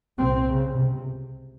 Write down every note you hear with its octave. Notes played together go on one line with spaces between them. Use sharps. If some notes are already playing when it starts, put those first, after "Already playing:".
C2 A#2 C4
C#3
C#2 C3